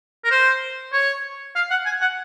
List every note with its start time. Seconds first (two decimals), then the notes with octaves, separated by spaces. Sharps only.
0.24 A#4
0.31 C5
0.93 C#5
1.55 F5
1.70 F#5
1.86 G#5
2.01 F#5